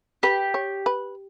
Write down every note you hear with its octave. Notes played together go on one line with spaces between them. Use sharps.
G4 B4
C#5
B4